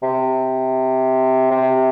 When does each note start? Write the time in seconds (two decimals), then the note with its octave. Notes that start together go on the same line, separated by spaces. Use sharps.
0.03 C3
1.51 C3